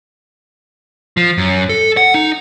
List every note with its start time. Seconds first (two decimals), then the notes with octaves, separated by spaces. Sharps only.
1.17 F3
1.38 F#2
1.69 A4
1.97 F#5
2.14 D#4